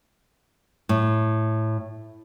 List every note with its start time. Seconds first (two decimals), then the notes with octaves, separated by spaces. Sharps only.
0.89 A2